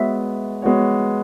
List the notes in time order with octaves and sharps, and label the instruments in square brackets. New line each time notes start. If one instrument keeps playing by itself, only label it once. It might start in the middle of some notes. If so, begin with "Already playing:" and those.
Already playing: [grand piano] G#3 B3 F#4 C#5 [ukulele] E5
[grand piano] G#3 B3 F#4 C#5